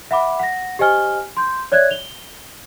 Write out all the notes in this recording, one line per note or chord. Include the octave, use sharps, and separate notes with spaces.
E5 F#5 B5 D6
F#5 A#6
G4 C5 D#5 G#5 F6 G7
C6 G6
C#5 D5 E5 F#6 G#6
F7 G7